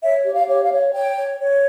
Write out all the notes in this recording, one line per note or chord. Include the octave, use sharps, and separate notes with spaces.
C#5 E5
G4
F5
C#5
F5
C#5
C#5 G5
C#5
C#5